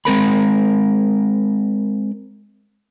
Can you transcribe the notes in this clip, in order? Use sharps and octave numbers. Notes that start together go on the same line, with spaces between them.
G#3 C4 A#4 B5